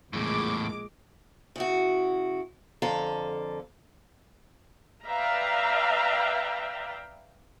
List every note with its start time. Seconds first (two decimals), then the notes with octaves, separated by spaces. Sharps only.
0.13 A#1 E2 A2 G#3 D6
1.56 C#3 E4 F#4
2.82 F2 D3 A4 F5 A#5
5.05 B4 D5 E5 F5 G5 A#5